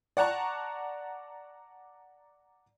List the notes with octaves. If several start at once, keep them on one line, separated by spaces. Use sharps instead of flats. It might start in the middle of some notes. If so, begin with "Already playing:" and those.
D5 F#5 A5 A#5 C#6